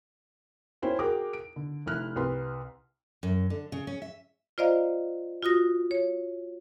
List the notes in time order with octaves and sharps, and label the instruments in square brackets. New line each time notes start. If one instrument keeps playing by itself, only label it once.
[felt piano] C#4 E4 C5 G5
F#4 G#4 A#4 G5 D6
D7
D3
F1 E4 F6 F#6
C2 B4 C6
[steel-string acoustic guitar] F#2
D3
C#3
C#4
E5
[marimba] F4 C5 D5 D#5 F5 A#5
F4 F#4 D#6 A#6
C#5